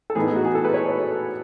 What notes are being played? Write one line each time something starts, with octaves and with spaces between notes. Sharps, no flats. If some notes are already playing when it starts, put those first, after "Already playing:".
A4
A2 E3 B3 D#4 G#4
F#4
G#4
A4
B4
C#5